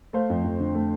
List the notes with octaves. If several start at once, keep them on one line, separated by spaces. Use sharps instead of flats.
A3 C5 F5
F2
F2
D3
A3